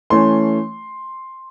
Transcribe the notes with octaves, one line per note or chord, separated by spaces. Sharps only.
E3 A3 C#4 C6